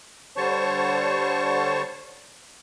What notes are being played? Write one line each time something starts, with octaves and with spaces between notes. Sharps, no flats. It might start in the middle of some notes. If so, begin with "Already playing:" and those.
D3 G3 C5 C#5 A5 C#6